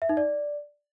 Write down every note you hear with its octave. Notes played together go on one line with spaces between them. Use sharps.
E5
D#4
D5